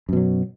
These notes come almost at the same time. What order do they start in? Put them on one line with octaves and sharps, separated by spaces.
F#2 B2 F#3